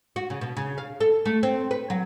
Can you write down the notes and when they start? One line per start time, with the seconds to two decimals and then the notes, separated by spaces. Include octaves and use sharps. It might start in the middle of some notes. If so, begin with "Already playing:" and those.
0.16 F#4
0.30 C#3
0.41 B2
0.57 C#3
0.78 F5
1.00 A4
1.25 A3
1.43 C4
1.71 B4
1.90 F#3